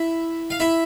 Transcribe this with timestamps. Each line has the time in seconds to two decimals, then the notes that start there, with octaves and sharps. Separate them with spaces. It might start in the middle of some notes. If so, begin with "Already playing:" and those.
Already playing: E4 E5
0.50 F5
0.60 E4 E5